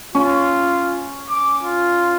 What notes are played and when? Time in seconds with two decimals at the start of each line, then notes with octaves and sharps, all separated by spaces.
0.15 C#4 F4
1.30 D6
1.63 F4